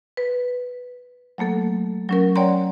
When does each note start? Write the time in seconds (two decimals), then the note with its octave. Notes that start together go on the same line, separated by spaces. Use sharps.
0.17 B4
1.38 F#3 A3 A#3 A4
2.09 F#3 C#4 A#4
2.36 C#5 D5 F#5 G5 A#5 C6